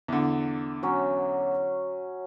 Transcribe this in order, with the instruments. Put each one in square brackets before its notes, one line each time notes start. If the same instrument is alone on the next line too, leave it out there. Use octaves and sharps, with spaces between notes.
[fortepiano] E2 D3
[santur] F#3 C#4